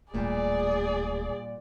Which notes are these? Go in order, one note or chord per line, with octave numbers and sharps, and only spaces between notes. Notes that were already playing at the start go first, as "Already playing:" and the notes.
D1 A#2 G3 A3 G#4 D5